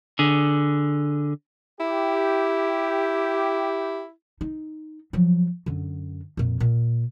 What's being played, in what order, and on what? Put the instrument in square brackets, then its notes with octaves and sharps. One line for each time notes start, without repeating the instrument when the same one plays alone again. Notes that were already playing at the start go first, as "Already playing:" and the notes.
[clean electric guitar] D3 G#4
[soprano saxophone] E4 [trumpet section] G4
[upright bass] D#4
F3 F#3
F#2 D3
F2 A#2
A#2